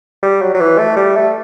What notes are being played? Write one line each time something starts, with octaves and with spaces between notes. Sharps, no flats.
G3
F#3
F#3
E3
A3
G3
A3